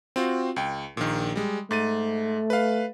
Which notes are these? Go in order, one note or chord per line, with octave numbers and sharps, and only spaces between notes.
C4 F4 F#4
C#2 G5
A#1 A#2 D#3
G3 G#3
G#2 A3 A6 D#7
B4 F5